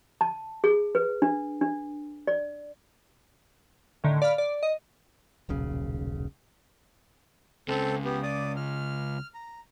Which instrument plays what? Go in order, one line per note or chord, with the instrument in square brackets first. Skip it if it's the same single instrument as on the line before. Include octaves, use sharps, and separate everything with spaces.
[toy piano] A5
G#4
B4
D4
D4
D5
[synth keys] A2 D3 D#3
D5 F5 B5 F6
D5
D#5
[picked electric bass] D#1 B1 C#3
[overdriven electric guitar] C#2 C#3 [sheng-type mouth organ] C4 A4
[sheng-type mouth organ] B3 G4
D5 D6 D#6
F6
A#5